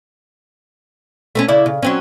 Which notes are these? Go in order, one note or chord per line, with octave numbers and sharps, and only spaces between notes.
A3 C4 C#4
C#3 E4 D5
C#3
F#3 C4 C#4